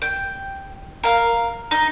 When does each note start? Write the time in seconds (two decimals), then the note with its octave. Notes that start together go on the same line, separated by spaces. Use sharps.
0.02 G5
1.04 A#4 F5
1.71 D#4